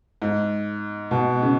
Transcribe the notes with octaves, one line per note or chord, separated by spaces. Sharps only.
G#2
B2
C#3